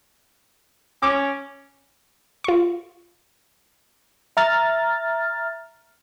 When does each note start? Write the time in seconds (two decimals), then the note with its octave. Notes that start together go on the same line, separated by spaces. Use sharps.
1.03 C#4 D6
2.44 F4 C#6
4.37 E5 A#5 F6 A6